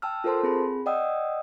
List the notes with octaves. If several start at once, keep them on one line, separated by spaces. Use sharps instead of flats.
G5 A5 E6 F6
F4 A4 A#4 C5 A5 C6
C4 G#4 B5
D5 D#5 F#5 G5 D#6 E6